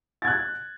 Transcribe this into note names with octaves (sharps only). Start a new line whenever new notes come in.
F#6 G#6 A6